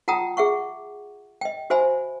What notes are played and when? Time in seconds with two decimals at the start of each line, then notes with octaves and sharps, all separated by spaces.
0.08 F4 F#5 G5 A5 A#5 D#6
0.37 G#4 E5 F#5 C#6
1.41 D#5 G5
1.70 F#4 C5 E5 G#5 B5